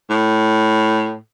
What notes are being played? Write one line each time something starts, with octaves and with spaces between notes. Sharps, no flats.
A2